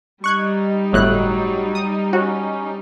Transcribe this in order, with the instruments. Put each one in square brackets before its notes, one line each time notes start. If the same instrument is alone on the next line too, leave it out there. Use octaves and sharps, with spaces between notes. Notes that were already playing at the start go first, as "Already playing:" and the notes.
[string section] G3 D#4 [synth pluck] C#6 F#6 G#6
[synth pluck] G1 A2 F#6 [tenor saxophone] F#3
[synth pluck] D#6
[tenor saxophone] C#4 [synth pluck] F#4